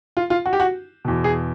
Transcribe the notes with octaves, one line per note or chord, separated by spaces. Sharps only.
F4
F4
F#4
G4
F#4
E2 B2
G#4